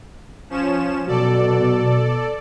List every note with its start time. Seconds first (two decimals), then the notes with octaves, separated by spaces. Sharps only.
0.50 F3 C#4 E7
1.08 B2 F#3 A4 D5